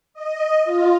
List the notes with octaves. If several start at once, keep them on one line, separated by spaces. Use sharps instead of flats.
D#5
F4